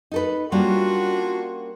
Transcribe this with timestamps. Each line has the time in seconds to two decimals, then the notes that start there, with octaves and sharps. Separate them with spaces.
0.12 D#4 A4 B4
0.52 G3 A#3 C#4 D4 F4 F#4